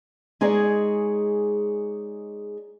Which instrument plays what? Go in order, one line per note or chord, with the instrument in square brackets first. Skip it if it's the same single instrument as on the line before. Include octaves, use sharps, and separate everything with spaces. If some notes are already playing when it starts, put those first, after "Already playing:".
[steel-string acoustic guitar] G#3 D#4 G#4 C#5 D5